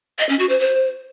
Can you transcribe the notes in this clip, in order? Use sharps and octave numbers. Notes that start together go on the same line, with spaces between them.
D#5
C#4
F#4
C5
C5